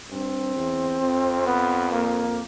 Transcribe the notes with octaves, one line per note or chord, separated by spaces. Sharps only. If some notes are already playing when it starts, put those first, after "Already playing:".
G2 C4
E2
F2
B3
A#3